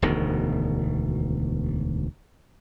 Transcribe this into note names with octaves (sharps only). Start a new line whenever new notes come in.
E1 D2 B2 D#3